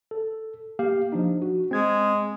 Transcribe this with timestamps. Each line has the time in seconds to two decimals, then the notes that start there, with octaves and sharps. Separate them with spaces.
0.11 A4
0.79 A#3 G4 F5
1.12 F3 D4 D#4
1.42 F#4
1.71 G#3 C4 G#6